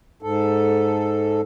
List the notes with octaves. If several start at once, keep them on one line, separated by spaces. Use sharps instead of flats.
G#2 A4